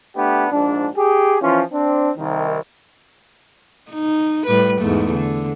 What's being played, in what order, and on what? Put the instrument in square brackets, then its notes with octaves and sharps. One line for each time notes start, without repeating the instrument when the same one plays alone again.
[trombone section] A3 B3 D4 G4
A#1 G#2 D4
G4 G#4
E3 F3 C#4 F4
C4 D4
C2 D#3
[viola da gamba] D#4
A2 G3 B4
E2 G#2 A3
D3